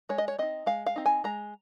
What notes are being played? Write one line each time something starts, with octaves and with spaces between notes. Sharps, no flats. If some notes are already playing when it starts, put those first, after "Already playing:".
G#3 C#5
D#5
C#5
C4 D#4 D#5
G#3 F5
F5
C4 D#4
G#5
G#3 A#5